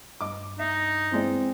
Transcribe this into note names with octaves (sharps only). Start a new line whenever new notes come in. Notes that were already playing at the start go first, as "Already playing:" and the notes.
G2 D#5 D6
D#4 E5
E3 G#3 C4 D5